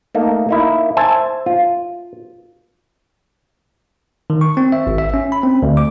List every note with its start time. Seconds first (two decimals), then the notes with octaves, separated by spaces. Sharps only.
0.15 A3 A#3 D#4
0.49 A#3 D#4 E4
0.97 C5 E5 G#5 A5
1.46 F4
4.30 D#3
4.41 C#6
4.57 C4
4.72 E5
4.87 G#1
4.98 E5
5.14 C#4
5.32 B5
5.43 C4
5.63 D2
5.77 D6